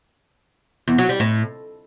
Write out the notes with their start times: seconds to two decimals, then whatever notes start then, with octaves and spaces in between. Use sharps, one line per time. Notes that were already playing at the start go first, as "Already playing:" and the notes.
0.87 E2
0.98 F#3
1.09 G3
1.20 A2